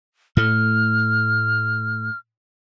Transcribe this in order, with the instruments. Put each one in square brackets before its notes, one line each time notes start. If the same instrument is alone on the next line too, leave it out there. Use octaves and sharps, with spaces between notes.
[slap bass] A2 A3 [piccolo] F6